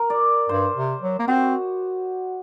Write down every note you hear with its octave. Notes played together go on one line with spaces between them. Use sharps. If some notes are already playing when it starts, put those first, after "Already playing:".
Already playing: A#4
D5
G2 C5
C3
F#3
A#3
C4 F#4